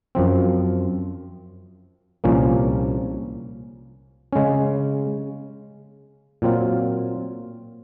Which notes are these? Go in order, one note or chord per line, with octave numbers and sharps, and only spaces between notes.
F#2 F3 C4
C2 A#2 F3 A#3 C#4
C#3 G#3 C#4
A#2 F#3 C4 F4